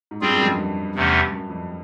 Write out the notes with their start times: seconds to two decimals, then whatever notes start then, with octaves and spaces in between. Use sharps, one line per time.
0.11 G#2
0.21 G2 G3 C4 F4 G#4
0.34 F#2
0.41 F2
0.45 F#2
0.58 G2
0.95 E2 C3 E3 A3 C#4
1.32 F#2
1.49 F2